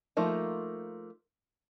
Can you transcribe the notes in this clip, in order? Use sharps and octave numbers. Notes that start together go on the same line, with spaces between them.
F3 A3 A#3 D#4